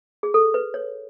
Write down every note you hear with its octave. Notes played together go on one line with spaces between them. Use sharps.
G#4
A4
B4
C#5